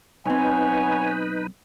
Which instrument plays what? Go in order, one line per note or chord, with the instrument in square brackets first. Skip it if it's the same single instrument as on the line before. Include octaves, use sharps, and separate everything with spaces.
[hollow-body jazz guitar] B1 C4 [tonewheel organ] D#4 B4 [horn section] C#5 F#5 G#5